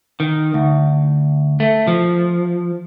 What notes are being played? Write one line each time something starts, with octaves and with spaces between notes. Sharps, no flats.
D#3
D2
A3
F3